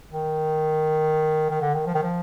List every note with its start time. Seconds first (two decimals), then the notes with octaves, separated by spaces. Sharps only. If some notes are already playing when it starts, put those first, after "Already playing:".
0.11 D#3
1.50 D#3
1.61 D3
1.74 D#3
1.86 F3
1.95 D#3
2.03 F3